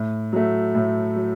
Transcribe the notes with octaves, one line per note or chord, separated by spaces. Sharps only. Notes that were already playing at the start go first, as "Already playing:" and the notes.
Already playing: A2
F#3 A3
A2
F#3